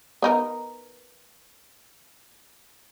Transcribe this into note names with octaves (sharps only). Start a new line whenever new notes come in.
B3 D#4 A#4